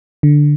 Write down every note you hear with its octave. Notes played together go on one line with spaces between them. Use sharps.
D3